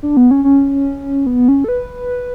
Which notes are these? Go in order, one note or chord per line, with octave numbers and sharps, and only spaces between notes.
D4
B3
C#4
C#4
B3
C#4
A4
B4